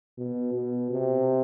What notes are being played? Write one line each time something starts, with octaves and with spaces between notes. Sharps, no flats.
B2
B2
C3